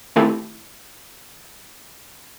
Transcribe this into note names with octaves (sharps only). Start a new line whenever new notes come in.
D#3 A3 C4 E4 G4